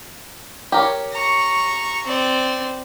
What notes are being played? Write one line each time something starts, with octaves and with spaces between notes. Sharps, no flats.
G4 A#4 C#5
A#5 C#6
C4 D5